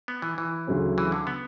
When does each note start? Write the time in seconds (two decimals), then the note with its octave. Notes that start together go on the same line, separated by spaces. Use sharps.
0.08 B3
0.22 E3
0.38 E3
0.67 D2 C#3 F#3 C#4
0.98 E3
1.12 D3
1.27 B3